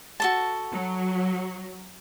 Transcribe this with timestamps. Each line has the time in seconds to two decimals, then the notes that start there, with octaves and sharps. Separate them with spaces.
0.20 F#4 A4 A5
0.71 F#3